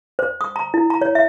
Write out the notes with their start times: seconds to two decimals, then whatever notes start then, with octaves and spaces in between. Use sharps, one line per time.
0.19 C5
0.41 D#6
0.56 A#5
0.74 E4
0.90 A#5
1.01 C#5
1.15 E5